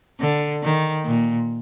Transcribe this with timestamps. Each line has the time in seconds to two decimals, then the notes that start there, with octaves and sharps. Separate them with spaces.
0.20 D3
0.63 D#3
1.05 A#2